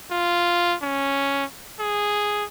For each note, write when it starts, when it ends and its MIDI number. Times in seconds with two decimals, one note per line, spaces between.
0.11 0.75 65
0.82 1.45 61
1.80 2.44 68